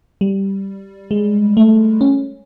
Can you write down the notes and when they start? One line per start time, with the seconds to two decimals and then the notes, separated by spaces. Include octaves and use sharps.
0.21 G3
1.11 G#3
1.57 A3
2.01 C#4